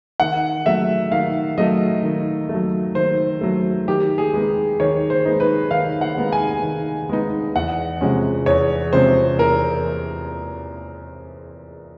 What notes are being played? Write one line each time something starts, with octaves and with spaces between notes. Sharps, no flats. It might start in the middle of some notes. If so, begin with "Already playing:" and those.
D#3 F#5
F#3 A3 E5
D#3 F5
F#3 A3 D#5
D#3
A3
F#3
D#3 C5
F#3 A3
D#3 G4
G#4
G#3 B3 D#4
D#3 C#5
C5
G#3 B3 D#4
B4
D#3 F5
F#5
G#3 B3 D#4
G#5
D#3
G#3 B3 D#4
E2 F#5
C3 F3 G#3 C#4
E2 C#5
C3 F3 G#3 C#4 C5
E2 A#4